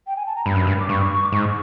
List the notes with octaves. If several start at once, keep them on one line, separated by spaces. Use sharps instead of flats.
G5
G#5
A5
A#5
G2 B5
F#2
G2
D6
G2 C#6
D6
G#2 C#6